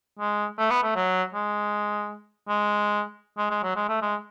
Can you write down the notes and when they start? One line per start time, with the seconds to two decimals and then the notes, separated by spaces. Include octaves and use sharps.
0.19 G#3
0.58 A3
0.70 B3
0.83 A3
0.96 F#3
1.34 G#3
2.49 G#3
3.38 G#3
3.51 G#3
3.63 F#3
3.76 G#3
3.89 A3
4.02 G#3